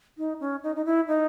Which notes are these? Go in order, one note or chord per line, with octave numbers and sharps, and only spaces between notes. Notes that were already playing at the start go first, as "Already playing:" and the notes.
D#4
C#4
D#4
D#4
E4
D#4